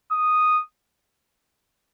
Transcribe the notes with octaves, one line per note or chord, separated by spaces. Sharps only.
D#6